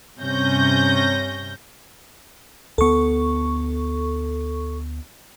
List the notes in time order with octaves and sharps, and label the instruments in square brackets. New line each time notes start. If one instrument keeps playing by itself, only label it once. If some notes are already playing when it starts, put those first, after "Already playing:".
[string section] G2 C3 C#4 G6 A#6
[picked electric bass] D2 B3 [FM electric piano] A4 C#6